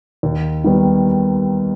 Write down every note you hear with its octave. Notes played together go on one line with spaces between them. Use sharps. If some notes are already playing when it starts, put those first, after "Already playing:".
D#2
D#3 G3 B3